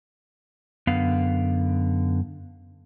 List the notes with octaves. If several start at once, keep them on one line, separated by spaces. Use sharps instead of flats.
F#2 D3 B3 F5